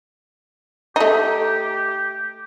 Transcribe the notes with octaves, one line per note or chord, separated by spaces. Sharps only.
A3 D#4 G4